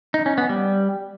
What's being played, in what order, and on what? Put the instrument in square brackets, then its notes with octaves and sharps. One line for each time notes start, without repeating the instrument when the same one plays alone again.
[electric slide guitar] D#4
C#4
B3
G3